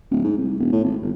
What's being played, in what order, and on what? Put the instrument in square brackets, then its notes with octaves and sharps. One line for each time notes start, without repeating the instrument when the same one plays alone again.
[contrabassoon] D1
G#2
C2
E1
A2
G#1
G1